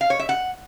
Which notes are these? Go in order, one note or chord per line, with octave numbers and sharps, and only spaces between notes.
F5
C#5
E5
F#5